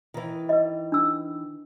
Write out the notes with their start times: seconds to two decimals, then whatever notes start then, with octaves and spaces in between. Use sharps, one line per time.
0.14 D#3 E3
0.49 B4 D#5
0.92 D4 E6